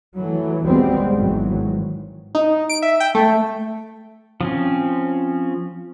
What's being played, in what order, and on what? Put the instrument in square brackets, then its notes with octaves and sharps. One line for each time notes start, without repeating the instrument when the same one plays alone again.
[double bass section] E3 F#3 A3
D#2 B2 G3 G#3 B3 C4
G#1 G#2 D#3 E3 F#3
[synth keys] D#4
D7
E5
G5
A3
[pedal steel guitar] F3 C4 C#4